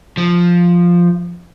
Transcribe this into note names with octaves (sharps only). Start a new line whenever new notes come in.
F3